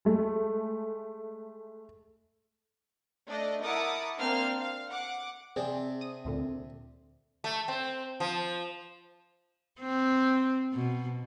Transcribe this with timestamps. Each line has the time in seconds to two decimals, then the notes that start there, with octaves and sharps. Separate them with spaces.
0.05 G#3 A3
3.26 A3 D4 D5 D#5
3.63 E4 A#4 F#5 A5 D6 D#6
4.18 A#3 C4 D4 C5 F5 F6
4.58 F5
4.90 F#5 D6
5.56 C3 C4 D4 G#4
6.01 D#6 D#7
6.25 D2 A#2 D3
7.44 A3
7.68 C4
8.20 F3
9.80 C4
10.73 B2